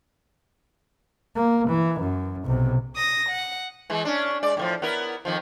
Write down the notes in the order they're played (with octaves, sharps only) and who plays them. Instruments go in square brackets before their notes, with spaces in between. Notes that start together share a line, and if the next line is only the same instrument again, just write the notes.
[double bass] A#3
E3
F#2
B1 C3
[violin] D#6 A#6
F#5
[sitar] E3 G#3
C#4 D4
G#3 D5
A2 D#3 F3
B3 E4 A#4
F2 D#3 F3